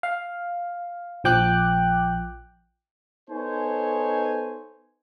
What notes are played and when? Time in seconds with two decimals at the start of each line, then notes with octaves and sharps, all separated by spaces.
0.03 F5
1.24 A#1 F3 G5 D6 F#6
3.30 B3 D#4 A4 C5 C#5 G#5